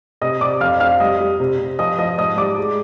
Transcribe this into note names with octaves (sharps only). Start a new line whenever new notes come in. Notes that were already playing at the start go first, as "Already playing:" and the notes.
C3 D#5 D#6
C3 D5 D6
F2 F5 F6
F2 F5 F6
G3 D#5 D#6
G3
C3
C3
F3 D#5 D#6
F3 D#5 D#6
G#2 D#5 D#6
G3 D5 D6
G#3